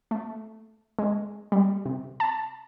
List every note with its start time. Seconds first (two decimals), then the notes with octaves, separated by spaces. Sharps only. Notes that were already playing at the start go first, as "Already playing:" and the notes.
0.11 A3
0.99 G#3
1.52 G3
1.85 C3
2.20 A5